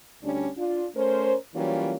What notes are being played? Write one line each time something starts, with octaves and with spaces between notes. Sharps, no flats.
D2 G3 C#4 D4
D4 F4
A3 C#4 A#4 C5
E3 F#3 G3 A#3 C#4 F4